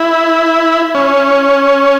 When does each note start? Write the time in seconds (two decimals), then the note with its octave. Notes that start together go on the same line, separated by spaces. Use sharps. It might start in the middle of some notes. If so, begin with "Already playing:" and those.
Already playing: E4
0.95 C#4